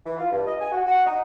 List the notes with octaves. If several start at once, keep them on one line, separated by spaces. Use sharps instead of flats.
E3
F4
G2
D#5
G#5
F#4
F#4
D#4